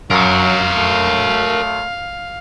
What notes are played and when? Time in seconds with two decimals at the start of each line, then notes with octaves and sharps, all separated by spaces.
0.11 F#2 F#3 A#4 C#5 F5
0.75 A3